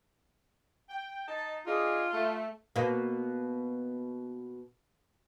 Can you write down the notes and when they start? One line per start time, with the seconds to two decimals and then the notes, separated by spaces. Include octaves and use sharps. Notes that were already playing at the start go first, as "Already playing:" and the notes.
0.90 G5
1.28 D#4 A5
1.67 D4 D#4 F4 G#4
2.13 A3
2.76 B2 A#3